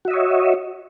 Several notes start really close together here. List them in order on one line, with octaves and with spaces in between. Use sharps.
F#4 E5 D#5 C#5